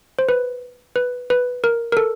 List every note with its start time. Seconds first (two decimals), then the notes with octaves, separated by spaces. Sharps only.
0.19 C5
0.29 B4
0.96 B4
1.30 B4
1.64 A#4
1.92 A#4
1.97 A4